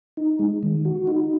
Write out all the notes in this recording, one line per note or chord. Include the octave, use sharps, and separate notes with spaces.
D#4
G#3
D#3
F#4
D#4